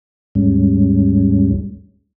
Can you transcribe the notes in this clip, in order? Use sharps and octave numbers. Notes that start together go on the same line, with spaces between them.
D#2 G#2 G3 G#3 C#4